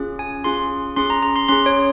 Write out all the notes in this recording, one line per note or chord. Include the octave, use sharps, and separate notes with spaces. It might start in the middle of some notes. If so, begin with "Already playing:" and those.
Already playing: C#4 F4 G#4
G#5
C#4 F4 G#4 C6
C#4 G#4 C6
A#5
A#5
C6
C#4 G#4 C6
C#5